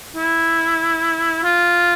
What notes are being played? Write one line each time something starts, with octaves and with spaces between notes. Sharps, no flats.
E4
F4